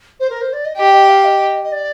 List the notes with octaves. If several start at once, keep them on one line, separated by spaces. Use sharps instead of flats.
C5
A#4
C5
D5
D#5
G4 D#5
D#5
F5
D#5
D#5
D5